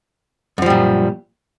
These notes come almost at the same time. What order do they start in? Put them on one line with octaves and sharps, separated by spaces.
F#2 F3 G3 A#2